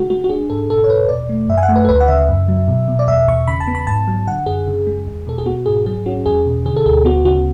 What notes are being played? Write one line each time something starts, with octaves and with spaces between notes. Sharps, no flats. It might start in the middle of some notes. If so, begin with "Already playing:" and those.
Already playing: C#3 G#3 F#4
G#3 F#4
F#4
D4 G#4
G#2 A4
B2 A4
C#5
E2 B4
B2 D5
A3
F#2 E5
G#5
F#5
A3
B4
A4
D2 B4
F#5
C#3 E5
F#2
F#3
B2
B2
D5
E2 E5
E2 C#6
C#3 B5
A5
B3
B5
G#2 A5
F#3
D3 F#5
F#2 G#4
C#3
G#3
E2
B2 A4
G#4
B3 F#4
G#2 G#4
F#3 G#4
C#4 F#4
E2 G#4
B2
D3 G#4
A4
D2 G#4
B3 F#4
C#3 F#4